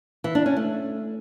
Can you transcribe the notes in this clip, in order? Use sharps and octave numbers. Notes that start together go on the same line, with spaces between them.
E3
D4
C#4
A3